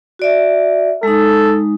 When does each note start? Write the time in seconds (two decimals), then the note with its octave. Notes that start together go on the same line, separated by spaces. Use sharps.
0.19 F#4 D5 E5
1.03 G#3 D#4 A4